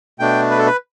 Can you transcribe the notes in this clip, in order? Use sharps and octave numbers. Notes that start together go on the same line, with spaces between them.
B2 A3 D4 G5
B4
A4
B4